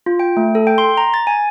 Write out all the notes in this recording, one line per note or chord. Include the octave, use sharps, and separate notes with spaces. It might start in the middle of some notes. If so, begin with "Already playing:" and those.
F4
G5
A3
A4
G5
C6
A#5
A6
G#5